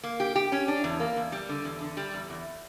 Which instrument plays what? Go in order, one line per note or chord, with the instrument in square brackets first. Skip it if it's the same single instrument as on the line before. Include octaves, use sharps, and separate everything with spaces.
[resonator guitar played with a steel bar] A#3
G4
G4
C#4
D4
E2
A#3
E2
G3
D3
E2
D3
G3
E2
E2